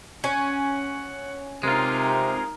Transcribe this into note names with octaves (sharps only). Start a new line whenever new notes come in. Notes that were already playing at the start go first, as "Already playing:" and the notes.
C#4 F#5
C3 G#3 D#4 F4 A#4